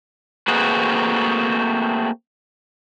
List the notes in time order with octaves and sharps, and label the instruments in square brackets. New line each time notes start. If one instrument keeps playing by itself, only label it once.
[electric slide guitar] A3 A#3 C4 F#4 G#4 B4